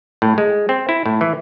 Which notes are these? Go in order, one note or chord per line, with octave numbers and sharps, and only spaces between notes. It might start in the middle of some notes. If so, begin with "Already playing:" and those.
A2
G#3
C4
E4
A2
E3